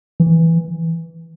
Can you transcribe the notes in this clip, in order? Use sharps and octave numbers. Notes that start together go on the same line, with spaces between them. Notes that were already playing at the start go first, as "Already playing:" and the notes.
E3